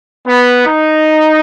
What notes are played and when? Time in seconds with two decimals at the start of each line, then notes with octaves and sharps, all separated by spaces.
0.27 B3
0.67 D#4